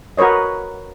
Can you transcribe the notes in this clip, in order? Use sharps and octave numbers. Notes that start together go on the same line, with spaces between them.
F#4 A#4 B4 C#5 D#5